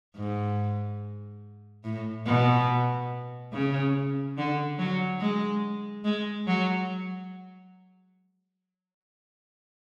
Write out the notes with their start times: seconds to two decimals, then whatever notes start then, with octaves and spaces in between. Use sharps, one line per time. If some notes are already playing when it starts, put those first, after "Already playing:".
0.16 G#2
1.84 A2
2.26 B2
3.52 C#3
4.37 D3
4.79 F#3
5.20 G#3
6.04 G#3
6.47 F#3